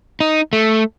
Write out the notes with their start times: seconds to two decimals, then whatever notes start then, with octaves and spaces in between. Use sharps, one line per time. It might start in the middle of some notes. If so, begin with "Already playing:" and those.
0.20 D#4
0.53 A3